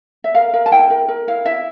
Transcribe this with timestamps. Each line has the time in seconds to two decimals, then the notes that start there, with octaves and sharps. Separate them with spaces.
0.24 E5
0.35 A#4 F5
0.54 A#4
0.66 A5
0.72 E4 G5
0.90 A#4
1.08 A#4
1.28 E4 F5
1.46 E4 E5